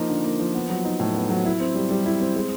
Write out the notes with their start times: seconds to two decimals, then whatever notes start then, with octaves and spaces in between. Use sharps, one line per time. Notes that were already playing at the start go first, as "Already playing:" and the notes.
Already playing: F3 A#3 D#4
0.09 D3
0.24 A#3
0.39 F3
0.54 B3
0.70 F#3
0.85 D#4
1.00 A2
1.14 B3
1.30 F#3
1.45 E4
1.60 C4
1.75 G3
1.90 G3
2.05 E4
2.20 C4
2.35 G#3